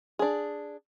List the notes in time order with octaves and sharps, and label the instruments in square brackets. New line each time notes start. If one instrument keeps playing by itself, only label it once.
[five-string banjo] D4 G#4